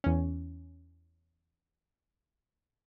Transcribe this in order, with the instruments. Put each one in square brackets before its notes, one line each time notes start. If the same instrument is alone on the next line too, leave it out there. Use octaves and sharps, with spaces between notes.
[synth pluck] E2 C#4